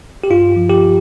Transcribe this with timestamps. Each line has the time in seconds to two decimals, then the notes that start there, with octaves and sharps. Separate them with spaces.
0.24 G4
0.30 G2 F4
0.56 F3
0.69 G4